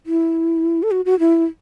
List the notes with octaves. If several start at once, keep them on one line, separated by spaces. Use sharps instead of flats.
E4
A4
F#4
F#4
E4